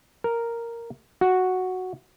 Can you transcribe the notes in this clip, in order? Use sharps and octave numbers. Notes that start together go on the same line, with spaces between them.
A#4
F#4